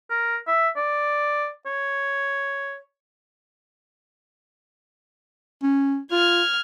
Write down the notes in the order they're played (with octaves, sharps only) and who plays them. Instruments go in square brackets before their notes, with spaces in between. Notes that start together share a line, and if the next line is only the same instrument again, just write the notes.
[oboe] A#4
E5
D5
C#5
[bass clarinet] C#4
[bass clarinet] F4 [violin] F6 G#6